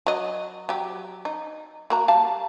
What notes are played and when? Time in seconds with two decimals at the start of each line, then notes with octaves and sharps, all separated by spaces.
0.06 F#3 D#5
0.69 F#3 G4
1.25 D#4
1.90 A#3 F#4 A#5
2.08 G3 F5 A5